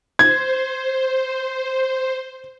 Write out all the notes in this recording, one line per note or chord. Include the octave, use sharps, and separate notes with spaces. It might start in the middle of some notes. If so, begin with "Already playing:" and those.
C5 G#6